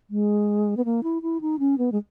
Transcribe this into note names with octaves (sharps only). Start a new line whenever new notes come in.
G#3
B3
A#3
E4
E4
D#4
C#4
B3
G#3